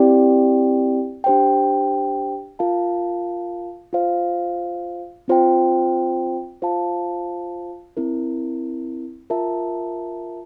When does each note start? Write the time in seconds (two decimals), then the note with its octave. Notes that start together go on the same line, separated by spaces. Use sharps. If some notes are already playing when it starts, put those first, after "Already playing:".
Already playing: C4 E4 G4 D5 G5
1.24 D4 G4 C5 G5
2.59 F4 A#4 F5 A5
3.93 F4 C5 F5
5.28 C4 F4 C5 G5
6.62 F4 C5 F5 A5
7.97 C4 E4 A#4
9.30 F4 A#4 E5 A5